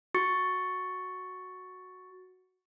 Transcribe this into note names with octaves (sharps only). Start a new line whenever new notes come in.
F#4 C#6 A6 C#7